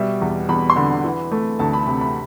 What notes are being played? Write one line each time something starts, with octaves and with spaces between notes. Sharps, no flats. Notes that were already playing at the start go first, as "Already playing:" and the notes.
Already playing: B2 G3 E5
E2
E2 B5
C6
D3 B5
E3
A3
D2 A5
B5
C3 B5
B5